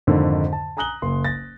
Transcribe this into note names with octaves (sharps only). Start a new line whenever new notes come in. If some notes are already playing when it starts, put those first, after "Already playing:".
F2 G#2 D3 D#3
A5
G#5 A#5 D#6 F#6 F#7 G7
F#1 C6
A6 A#6